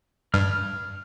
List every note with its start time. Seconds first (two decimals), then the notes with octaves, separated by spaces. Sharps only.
0.34 G2 F6